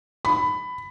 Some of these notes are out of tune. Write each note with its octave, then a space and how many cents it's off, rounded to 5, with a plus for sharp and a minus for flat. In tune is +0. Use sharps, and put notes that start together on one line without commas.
B5 +15